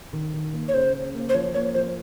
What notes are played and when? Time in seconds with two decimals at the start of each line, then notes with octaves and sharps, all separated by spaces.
0.13 D#3
0.34 D#3
0.53 A#3
0.68 C#5
0.74 C#3 C5
0.95 C#3
1.15 A#3
1.29 C5
1.35 F3 C#5
1.54 A#3 C#5
1.74 F3 C5